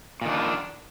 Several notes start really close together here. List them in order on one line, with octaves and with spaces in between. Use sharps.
A#2 D#3 D4